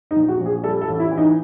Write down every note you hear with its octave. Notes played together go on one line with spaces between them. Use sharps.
D#4
A#1
F#4
A#1
G#4
G3 A4
A4
A1
E4
E3
D#4